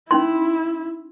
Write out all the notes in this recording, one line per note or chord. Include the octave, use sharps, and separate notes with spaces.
C#4 D#4 E4 C6